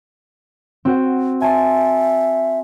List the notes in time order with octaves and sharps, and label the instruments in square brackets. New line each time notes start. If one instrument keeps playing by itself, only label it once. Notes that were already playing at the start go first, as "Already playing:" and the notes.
[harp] C4 F#4
[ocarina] E5 [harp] G#5 A5 C6